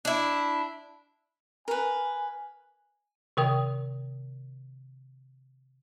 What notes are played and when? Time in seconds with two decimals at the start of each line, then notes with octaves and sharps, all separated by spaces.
0.05 D4 E4
1.68 A#4 B4 G#5
3.37 C3 D#3 A#4 G5 D#6